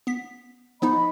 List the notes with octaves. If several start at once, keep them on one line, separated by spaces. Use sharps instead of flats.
B3 B6
F3 B3 D#4 D#5 B5